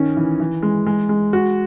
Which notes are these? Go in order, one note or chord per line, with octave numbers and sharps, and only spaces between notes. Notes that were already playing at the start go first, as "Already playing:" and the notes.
Already playing: D#3 C#4
E3
E3
G#3
G#3
G#3
F#4